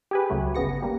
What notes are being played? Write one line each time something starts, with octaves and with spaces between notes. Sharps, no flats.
G4 G#4 B4
C#2 C#3 F#3 A3
G1 C#3 B3 A#6 C#7
G3 A#3